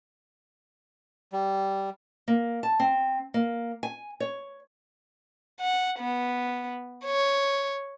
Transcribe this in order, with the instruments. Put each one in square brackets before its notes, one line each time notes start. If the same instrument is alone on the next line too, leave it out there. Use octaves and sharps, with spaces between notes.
[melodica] G3
[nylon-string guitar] A#3
A5
C4
A#3
G#5
C#5
[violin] F#5
B3
C#5